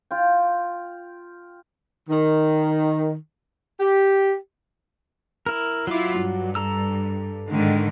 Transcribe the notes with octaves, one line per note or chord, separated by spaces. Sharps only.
F4 G5
D#3
G4
E4 A#4
F#3 E4 F4 D6
G2
A4 A#5 E6
G#2 D3 D#3